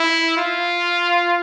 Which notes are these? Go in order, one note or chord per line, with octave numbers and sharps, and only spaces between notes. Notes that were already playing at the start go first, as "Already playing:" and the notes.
Already playing: E4
F4